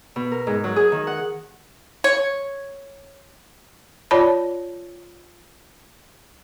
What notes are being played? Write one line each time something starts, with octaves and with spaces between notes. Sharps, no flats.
B2
A#4
G#2
F#3
G#4
D#3
F#5
C#5
F4 C#5 D5 A5 B5